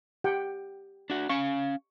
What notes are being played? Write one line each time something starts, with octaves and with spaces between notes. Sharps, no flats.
G4 F#5 G5
D4 F#4
C#4 F5 C#6